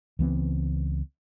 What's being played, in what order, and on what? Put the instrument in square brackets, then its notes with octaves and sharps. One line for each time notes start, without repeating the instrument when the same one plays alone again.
[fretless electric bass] C#2 E3 B3 C4